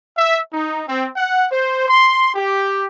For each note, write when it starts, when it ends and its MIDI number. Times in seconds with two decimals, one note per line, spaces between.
0.17 0.39 76
0.53 0.83 63
0.88 1.08 60
1.16 1.45 78
1.52 1.88 72
1.89 2.31 84
2.35 2.86 67